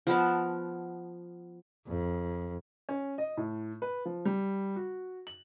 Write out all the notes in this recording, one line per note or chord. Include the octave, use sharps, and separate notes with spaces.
F3 B3 A#4 A5
F2
C#4
D#5
A2
B4
F3
G3
F#4
F#7